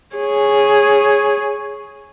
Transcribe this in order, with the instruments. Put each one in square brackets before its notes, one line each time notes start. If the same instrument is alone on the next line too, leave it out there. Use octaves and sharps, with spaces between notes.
[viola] G#4 C#5